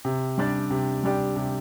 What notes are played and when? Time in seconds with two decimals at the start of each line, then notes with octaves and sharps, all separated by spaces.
0.05 C3
0.38 G3 D4 G4 D5
0.70 C3
1.03 G3 D4 G4 D5
1.36 C3